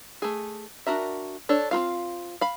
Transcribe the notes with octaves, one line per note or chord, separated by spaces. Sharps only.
A3 G#4
D4 F#4 A#4 E5
D4 A4 C#5
C4 D#4 F4 F5
F5 B5